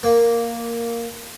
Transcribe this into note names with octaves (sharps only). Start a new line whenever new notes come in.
A#3